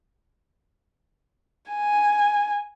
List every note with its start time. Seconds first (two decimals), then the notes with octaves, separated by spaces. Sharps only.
1.71 G#5